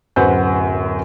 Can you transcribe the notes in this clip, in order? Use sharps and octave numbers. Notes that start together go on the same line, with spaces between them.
D1 F#2 B4 C5 F#5 G6